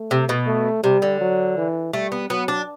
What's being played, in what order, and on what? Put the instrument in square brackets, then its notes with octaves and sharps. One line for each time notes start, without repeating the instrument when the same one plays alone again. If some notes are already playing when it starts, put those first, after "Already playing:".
Already playing: [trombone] A3
[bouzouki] C3
B2
[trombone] A3
[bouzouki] C3 [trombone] G3
[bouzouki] D3
[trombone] F#3
E3
[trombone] G3 [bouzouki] A3
[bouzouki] B3
[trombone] F#3 [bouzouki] B3
[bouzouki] D4